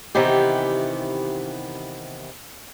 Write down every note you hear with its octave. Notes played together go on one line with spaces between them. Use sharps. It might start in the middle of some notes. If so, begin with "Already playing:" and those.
C3 D#3 E3 B3 G4